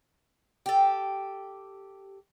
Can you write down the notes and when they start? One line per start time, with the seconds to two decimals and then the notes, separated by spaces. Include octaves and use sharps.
0.66 G4 A4